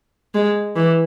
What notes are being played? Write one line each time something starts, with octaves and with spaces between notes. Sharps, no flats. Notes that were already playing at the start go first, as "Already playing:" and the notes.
G#3
E3